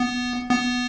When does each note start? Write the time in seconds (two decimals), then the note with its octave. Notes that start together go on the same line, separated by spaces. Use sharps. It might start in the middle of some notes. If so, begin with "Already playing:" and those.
Already playing: B3
0.50 B3